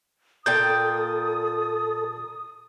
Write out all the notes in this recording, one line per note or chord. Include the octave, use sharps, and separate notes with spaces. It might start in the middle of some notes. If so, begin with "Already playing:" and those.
A#2 A4 D5 G5 D#6 G6